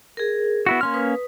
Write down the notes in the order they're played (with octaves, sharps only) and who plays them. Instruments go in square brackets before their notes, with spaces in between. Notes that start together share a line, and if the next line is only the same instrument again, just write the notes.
[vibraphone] G#4 A#4
[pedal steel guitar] B3 E4 F#4
[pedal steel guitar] A#3 C#4 F6 [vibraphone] C6
[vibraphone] B4 D#6